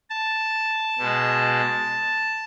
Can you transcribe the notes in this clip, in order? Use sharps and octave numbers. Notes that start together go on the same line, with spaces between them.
A5
B2 G#3